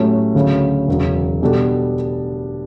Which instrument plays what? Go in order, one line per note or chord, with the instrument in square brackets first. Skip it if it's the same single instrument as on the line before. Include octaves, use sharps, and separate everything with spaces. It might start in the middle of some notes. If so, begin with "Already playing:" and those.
Already playing: [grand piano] A2 F#3 A3 C#4 G4
D2 C#3 F#3 C#4
E1 E2 C#3 F#3
B2 G3 B3 D4 A4